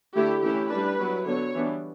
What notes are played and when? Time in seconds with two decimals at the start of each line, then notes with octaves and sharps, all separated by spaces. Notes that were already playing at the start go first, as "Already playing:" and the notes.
0.15 D3 A3 E4 G4
0.43 E3 A3 C#4 E4 G4
0.70 G3 D4 B4
0.99 F#3 B3 E4
1.26 D3 F#3 B3 C#5
1.55 E3 G3 B3 D4